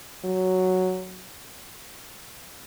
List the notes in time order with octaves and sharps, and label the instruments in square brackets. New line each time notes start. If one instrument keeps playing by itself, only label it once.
[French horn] F#3